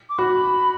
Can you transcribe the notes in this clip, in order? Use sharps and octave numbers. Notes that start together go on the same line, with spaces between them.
D6
F#4 B5